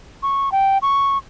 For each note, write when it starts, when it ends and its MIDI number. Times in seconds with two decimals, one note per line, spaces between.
0.23 0.50 85
0.52 0.78 79
0.82 1.18 85